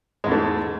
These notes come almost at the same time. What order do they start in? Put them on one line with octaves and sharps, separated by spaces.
G#3 E2 G#2 A3